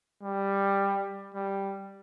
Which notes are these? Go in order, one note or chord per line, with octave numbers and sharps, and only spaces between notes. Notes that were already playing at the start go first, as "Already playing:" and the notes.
G3
G3